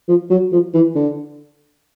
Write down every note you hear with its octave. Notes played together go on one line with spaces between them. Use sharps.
F3
F#3
F3
E3
D3